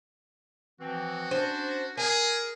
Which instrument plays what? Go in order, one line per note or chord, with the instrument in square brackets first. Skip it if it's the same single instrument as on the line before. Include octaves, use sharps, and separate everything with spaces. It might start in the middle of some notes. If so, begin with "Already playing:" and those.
[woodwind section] E3 F3 C4 [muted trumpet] F#4
[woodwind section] C#4 D4 [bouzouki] C5
[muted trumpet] G#4 [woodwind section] A#4 [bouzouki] G#5